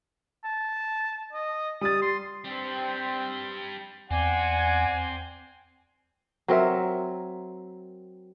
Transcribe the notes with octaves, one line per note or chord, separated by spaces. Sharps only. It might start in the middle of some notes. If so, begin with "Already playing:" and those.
A5
D#5
G3 D#6 A6
C6
G3 C4 D4
E2 C4 D5 F#5 G#5
F#3 C4 A#4 E5